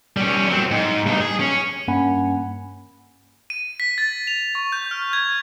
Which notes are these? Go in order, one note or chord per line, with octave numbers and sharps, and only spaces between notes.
G3 C#4
F#3 C4
G#2
G2 D#4
G#4
C#4
G2 A#3 C#4 F#5 G#5 B5
D#7
B6
A6
F7
C#6
G6
F6
G#6